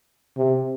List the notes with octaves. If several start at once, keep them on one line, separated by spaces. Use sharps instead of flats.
C3